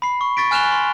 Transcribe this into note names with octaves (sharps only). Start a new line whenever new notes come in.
B5 C7
C#6
C#6 A6 B6 D7
G#5 F6 F#6 E7 F7 G7
C6